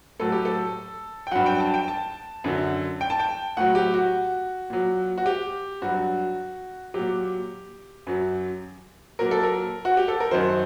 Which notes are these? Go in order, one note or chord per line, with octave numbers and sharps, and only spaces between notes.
A2 F#3 A4
G4
A4
G5
G2 F#3 F#5
G5
A5
G5
A5
F#2 D3 F#3
G5
A5
G5
A2 F#3 F#5
G4
F#4
A#2 F#3
F#4
G4
G2 F#3 F#4
A#2 F#3 G4
F#2 F#3
A#2 F#3 A#4
A4
A#4
F#4
G4
A4
A#4
F#2 D#3 F#3 C5